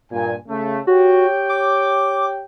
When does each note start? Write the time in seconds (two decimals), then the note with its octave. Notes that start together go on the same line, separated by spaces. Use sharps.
0.11 G2 A#2 G#5
0.48 C#3 A3
0.87 F#4 G4 C#5 G5
1.49 D6